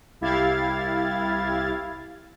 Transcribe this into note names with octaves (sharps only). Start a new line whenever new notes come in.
C2 E4 G4 F5 G#6 A6